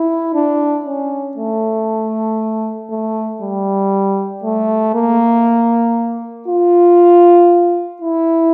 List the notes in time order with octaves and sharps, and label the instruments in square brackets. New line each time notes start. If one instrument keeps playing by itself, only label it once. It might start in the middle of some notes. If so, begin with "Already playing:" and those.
Already playing: [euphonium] E4
D4
C#4
A3
A3
G3
A3
A#3
F4
E4